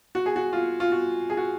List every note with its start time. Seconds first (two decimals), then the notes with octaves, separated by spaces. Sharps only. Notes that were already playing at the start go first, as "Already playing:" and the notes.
0.15 F#4
0.26 G#4
0.36 F#4
0.53 F4
0.80 F4
0.92 F#4
1.30 G#4
1.37 F#4